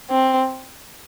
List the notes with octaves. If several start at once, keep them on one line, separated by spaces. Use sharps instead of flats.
C4